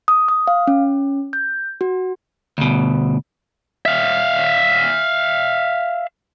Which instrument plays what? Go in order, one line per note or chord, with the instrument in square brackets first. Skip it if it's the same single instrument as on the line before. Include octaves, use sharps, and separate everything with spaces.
[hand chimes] D#6
D#6
F5
C#4
G6
F#4
[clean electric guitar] D2 B2
[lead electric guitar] E5 F5